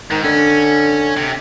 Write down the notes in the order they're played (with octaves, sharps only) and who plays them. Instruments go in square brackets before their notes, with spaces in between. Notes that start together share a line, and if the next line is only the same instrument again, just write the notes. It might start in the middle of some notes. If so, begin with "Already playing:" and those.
[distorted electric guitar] G#2 [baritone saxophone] D#3
[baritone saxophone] D3 [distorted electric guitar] C#4
[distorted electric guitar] C3